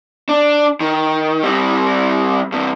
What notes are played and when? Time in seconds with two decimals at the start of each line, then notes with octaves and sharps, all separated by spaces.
0.29 D4
0.80 D#3
1.43 G3 C4
2.52 G2 C3